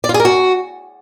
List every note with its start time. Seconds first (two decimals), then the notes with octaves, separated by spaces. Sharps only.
0.04 D5
0.09 F4
0.14 G#4
0.20 A#4
0.25 F#4